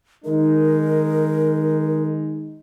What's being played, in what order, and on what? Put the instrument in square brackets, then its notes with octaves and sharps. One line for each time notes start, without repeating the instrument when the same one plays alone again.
[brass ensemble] D#3 G#3 D#4 [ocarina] A#4